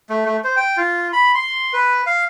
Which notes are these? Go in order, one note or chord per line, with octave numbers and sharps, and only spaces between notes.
A3
A3
C5
G5
F4
B5
C6
B4
F5